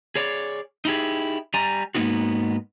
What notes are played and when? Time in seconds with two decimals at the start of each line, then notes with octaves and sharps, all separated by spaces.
0.16 G#4 C#5 D5
0.85 D#4 E4 G4 G#4
1.54 G3 G#5 A#5
1.95 G#2 C#3 A#3 B3 D#4 F#4